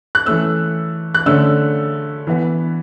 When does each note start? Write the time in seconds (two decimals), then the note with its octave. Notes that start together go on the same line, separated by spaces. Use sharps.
0.15 F#6
0.25 E3 A3 C#4 E6
1.14 F#6
1.26 D3 A3 C#4 E6
2.27 E3 B3